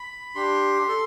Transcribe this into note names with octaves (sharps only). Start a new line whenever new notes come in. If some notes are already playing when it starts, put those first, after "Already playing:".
Already playing: B5
D4 G4 C6
A4